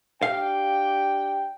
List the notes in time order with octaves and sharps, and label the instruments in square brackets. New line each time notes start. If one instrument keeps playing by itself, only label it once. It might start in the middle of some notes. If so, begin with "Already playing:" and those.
[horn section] D4 G4 G5 [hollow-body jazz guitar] F5